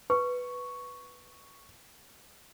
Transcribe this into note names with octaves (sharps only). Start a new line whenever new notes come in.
B4 C#6